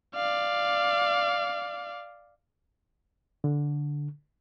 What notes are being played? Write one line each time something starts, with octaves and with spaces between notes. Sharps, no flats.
D5 F5
D3